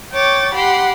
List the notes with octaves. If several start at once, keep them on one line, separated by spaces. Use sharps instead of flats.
C#5 G5 D6 A6
G4 F#5 B5 C6